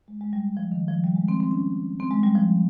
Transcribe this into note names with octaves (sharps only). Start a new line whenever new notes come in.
G#3
G#3
G3
F3
D#3
F3
G3
G#3
C4
C4
C#4
C4
G#3
G3
F3